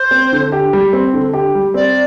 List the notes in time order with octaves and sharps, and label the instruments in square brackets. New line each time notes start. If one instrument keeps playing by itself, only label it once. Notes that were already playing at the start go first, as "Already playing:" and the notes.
Already playing: [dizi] C5
[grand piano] C4
D3
G4
G3
C4
D3
G4
G3
[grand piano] C4 [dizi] D5